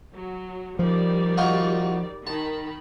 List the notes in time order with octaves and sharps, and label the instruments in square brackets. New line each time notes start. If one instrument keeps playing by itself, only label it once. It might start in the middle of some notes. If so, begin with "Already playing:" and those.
[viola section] F#3
[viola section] D#3 G3 D5 [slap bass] F3
[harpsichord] D#4 F4 F#4
[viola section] D#3 B5 [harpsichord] A5